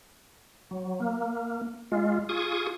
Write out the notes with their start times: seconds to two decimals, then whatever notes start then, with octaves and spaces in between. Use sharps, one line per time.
0.71 F#3
1.00 A#3
1.92 G#3 F4
2.29 F4 G#4 C#6 D#6